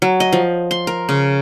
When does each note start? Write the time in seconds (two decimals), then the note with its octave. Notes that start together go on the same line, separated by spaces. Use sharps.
0.02 F#3
0.20 D#5
0.33 F3
0.71 C6
0.87 A#4
1.09 C#3